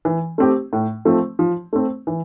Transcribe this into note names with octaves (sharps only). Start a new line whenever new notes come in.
E3
A3 C4 G4
A2
F3 A3 C4
F3
A3 C4
E3